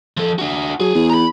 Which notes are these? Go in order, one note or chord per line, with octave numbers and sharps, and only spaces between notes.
F3 A4
D4 F#4
F#3 G#4
E2
A#5 B5